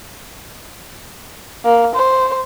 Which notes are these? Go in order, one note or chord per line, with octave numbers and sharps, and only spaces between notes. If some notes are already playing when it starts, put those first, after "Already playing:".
A#3
C5